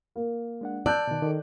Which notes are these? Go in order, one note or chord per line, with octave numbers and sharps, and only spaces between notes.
A#3
G#3 D4 F#5
D5 A5 E6 F#6 G6
B2 D#3
D#3 A4